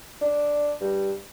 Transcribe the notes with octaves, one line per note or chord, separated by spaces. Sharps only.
D4
G2